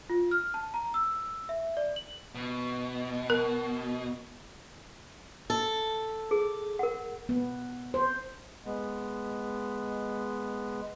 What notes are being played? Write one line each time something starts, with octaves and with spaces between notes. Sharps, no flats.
F4
F6
A5
A#5
E6
E5
D5
F#7
B2
A#4
A4
G#4
A#4 F#5
B3
C5
G#3 B3